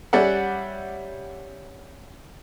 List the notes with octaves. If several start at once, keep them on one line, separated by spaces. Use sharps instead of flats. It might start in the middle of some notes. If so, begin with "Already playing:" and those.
G3 C#4 D5 E5 F#5